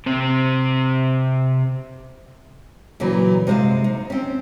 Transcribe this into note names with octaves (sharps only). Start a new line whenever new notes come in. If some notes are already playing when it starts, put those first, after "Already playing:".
C3 C4
A#2 C#3 E3 F#3
C3 G#3 A#4 C5 F5
D#4
C4 C#4